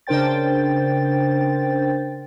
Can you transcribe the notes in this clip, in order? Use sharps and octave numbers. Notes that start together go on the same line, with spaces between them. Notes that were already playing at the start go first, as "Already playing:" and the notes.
C#3 D4 A#4 C5 G5 A6